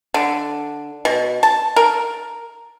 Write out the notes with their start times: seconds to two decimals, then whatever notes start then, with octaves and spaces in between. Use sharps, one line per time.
0.14 D3
1.05 B2
1.43 A5
1.76 A#4